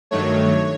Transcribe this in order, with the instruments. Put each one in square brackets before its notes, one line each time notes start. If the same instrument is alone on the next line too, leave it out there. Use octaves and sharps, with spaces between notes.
[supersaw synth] G2 D#3 F#3 A3 C#5